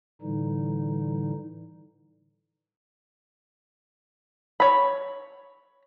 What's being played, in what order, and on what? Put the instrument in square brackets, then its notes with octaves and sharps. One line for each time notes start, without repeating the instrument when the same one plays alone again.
[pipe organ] A2 D3 E3 G3 D#4
[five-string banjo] C#5 B5